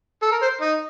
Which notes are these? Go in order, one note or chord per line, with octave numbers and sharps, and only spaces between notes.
A4
A#4
C5
D#4